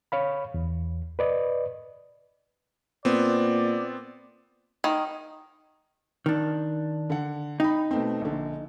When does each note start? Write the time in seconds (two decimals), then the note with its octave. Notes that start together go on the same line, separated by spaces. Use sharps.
0.12 C#5 F5 B5
0.54 E2
1.19 B4 D5 D#5
3.05 A#2 B3 C4 D5
4.84 D#3
6.26 D#3 D4
7.10 D3 F#5
7.60 D#4 G5 B5
7.91 B2 A3 C4
8.21 A#1 D3